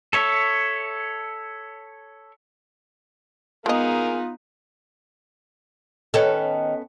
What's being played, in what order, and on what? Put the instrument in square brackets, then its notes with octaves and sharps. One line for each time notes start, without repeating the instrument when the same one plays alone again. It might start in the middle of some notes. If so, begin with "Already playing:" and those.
[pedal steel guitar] A4 C#5 E5
[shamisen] G#3 D#5 [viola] B3 D#4 [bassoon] F4 [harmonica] G#4 A#4 F5
[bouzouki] D#3 [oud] B3 C#4 A4